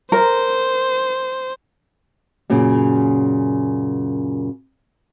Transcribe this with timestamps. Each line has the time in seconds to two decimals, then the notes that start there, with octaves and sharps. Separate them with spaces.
0.12 A#4 C5
2.50 F#2 A#2 C#3